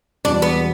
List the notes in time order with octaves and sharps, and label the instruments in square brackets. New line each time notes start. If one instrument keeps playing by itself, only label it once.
[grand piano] E1 E2 B2 G3 [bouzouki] D4
[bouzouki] B3